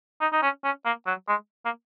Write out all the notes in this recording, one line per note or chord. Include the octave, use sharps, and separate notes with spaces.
D#4
D#4
C#4
C#4
A#3
F#3
G#3
A#3